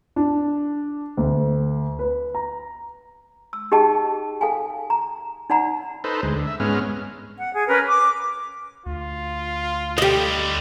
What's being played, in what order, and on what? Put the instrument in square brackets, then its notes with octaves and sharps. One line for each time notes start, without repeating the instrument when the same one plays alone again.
[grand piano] D4
D2
B4
A#5
[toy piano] E6
D#4 G4 G#4 D#5 G5 A5
A4 F5 G5 G#5
A#5
D#4 D5 F#5 A#5 B5
[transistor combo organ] D#4 A4 B4 C5
D2 G#3
D3
E5
G#2 G#3 B3 C#4 F6
[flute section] F#5
G#4
C#4 A#4 B4
D6
[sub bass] D2 [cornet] F4
[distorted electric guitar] D3 G3 [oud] G4 D#5